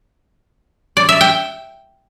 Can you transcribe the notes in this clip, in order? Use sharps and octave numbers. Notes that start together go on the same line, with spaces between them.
D5
E5
G5